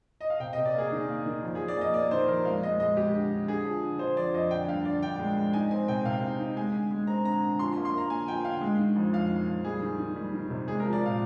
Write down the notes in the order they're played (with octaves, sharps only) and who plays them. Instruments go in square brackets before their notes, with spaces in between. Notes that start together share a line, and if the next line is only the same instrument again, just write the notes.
[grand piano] D#5
F5
C3 G5
D#5
C3
D5
A#3 G#4
D#3
A#3
D#3
F2
G#4
F2
D5
A#3 D#5
A#3 D5
D#3 C5
F2 A#4
G#3 F5
G#3 D#5
G#3 D#5
G#3 G4
D3
D3
D3 G#4
F3
D3
D3 C5
F2 D5
F2 D#5
D3 G5
G2 F5
D3 D5
D3 G5
G#3
G#3
D#4 G#5
C4 G#5
C3 G5
C3 F5
D#4
D#4
G#3 G#5
D3
G#3
C4 A#5
D3 A#5
D3
F3 C6
C6
A#3
C6
A#3 A#5
D3 G#5
F3 G5
D3 F5
G#3
D#3
F2
F2 F5
D#3
F2
G3 G#4
D#3
D#3
G3
D#3
C3
G#3 G#4
A#4
F3
D5
A#2 F5